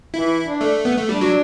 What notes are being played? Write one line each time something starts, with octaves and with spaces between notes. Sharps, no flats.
E3 E4
D4
A3
B3
A3
G3 D4
F#3